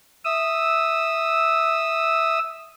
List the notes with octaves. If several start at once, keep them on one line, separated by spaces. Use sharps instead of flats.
E5 D#6 E6